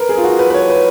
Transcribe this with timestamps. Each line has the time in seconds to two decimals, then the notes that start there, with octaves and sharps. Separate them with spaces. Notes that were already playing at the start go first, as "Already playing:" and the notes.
Already playing: A#4 B4
0.09 G#4
0.17 F4
0.24 F#4
0.39 B4
0.50 B4
0.54 C#5
0.70 B4